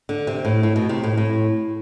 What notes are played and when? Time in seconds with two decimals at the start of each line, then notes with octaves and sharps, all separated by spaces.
0.09 D3
0.27 C3
0.45 A2
0.63 A2
0.76 B2
0.89 C3
1.04 A2
1.17 A2